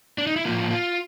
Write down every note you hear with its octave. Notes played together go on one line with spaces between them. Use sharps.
D4
D#4
E4
A2 F3 A#3 F4
F4